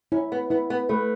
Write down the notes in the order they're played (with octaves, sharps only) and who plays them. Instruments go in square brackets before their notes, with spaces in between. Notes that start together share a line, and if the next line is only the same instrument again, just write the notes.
[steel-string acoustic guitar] C#4 [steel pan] E4
[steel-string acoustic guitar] B3
[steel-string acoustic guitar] B3 [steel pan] E4
[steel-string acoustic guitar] B3
[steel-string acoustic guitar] A3 [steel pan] B4